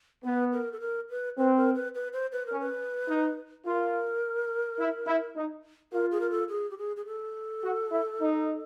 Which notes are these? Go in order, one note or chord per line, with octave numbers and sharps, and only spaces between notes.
B3 B4
A#4
A4
A#4
B4
C4 B4
A#4
B4
B4
C5
B4
A#4
C#4
B4
D#4
F4 A#4
E4
E4
D#4
F4 A#4
G#4
A#4
A4
G#4
G4
G#4
G#4
A4
F#4
E4
D#4